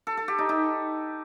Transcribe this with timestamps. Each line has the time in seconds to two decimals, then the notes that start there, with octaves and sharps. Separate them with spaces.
0.07 A4
0.17 A4
0.28 G4
0.39 D#4
0.49 D#4